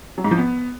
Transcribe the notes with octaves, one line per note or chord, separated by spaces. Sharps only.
F#3
G#2
F3
B3